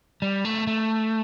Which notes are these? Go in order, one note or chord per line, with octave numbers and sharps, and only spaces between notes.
G3
A3
A3